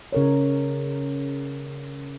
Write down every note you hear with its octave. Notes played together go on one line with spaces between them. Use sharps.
C#3 A#4 C#5